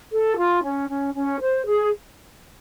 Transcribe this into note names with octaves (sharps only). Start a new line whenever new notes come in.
A4
F4
C#4
C#4
C#4
C5
G#4